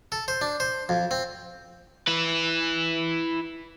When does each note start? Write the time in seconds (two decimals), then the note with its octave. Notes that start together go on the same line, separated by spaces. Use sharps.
0.12 A4
0.28 C5
0.41 D4
0.60 C5
0.89 F2
1.11 C4
2.07 E4 B4